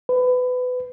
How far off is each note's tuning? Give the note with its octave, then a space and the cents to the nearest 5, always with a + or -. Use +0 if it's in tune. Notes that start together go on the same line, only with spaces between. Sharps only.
B4 +25